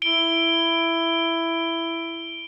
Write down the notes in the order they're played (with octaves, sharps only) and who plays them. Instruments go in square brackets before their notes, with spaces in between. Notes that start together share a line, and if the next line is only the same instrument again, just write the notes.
[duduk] E4 [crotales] D7 G7